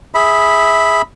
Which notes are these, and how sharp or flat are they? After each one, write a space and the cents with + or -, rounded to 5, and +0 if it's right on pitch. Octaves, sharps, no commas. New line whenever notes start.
G#4 +0 E5 -15 B5 +0